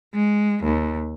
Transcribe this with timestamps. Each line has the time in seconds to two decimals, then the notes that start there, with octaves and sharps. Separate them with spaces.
0.14 G#3
0.64 D#2